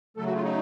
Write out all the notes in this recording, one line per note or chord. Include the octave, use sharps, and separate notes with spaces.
C#3 F#3 A3 A4
F#4
F4
D#4